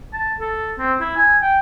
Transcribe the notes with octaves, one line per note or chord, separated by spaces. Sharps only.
A5
A4
C4
E4
G#5
G5